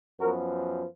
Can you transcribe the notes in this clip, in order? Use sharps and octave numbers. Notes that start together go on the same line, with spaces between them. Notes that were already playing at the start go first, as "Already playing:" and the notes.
F#2 F3 B3 F#4 A#4